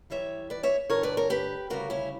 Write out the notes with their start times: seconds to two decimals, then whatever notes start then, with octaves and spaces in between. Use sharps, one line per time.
0.10 F#2 E3 G3 C#5 E5
0.50 B4 D5
0.63 C#5 E5
0.90 G2 D3 G3 A#4 C#5
1.03 B4 D5
1.17 A#4 C#5
1.30 G4 B4
1.70 D2 C#3 G3 F#4 A#4
1.90 C#4 E4